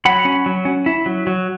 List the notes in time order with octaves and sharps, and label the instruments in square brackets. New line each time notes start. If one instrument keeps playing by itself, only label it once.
[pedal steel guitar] F#3 F#5 B5
C#4
F#3
C#4
E4
F#3
F#3